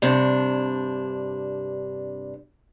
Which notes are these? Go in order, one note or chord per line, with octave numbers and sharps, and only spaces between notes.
G2 C3 D4